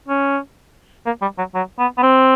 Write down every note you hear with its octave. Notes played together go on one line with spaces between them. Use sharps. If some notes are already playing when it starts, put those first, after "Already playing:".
C#4
A#3
G3
F#3
F#3
B3
B3
C4